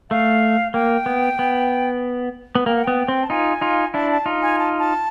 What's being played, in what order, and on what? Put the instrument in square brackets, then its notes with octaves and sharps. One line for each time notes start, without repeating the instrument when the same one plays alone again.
[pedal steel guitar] A3 [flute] F5
[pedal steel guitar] A#3 [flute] G5
[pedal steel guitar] B3
B3
B3
[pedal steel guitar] A#3 [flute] G5
[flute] F#5
[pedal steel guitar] B3 [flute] G5
[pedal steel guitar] C4
[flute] A5
[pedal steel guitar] D#4 F4 [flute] G#5
[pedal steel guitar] D#4 F4
[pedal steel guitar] D4 E4 [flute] A5
[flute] A5
[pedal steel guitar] D#4 F4
[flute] G#5
A5
A5